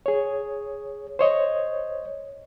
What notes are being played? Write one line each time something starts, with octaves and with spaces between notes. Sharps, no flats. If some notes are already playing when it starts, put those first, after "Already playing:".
G#4 C#5
C5 C#5 D#5